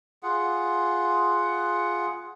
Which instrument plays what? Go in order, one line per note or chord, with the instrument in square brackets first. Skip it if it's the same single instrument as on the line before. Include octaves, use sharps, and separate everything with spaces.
[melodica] F4 G#4 F#5